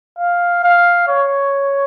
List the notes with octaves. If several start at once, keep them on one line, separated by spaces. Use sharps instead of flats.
F5
F5
C#5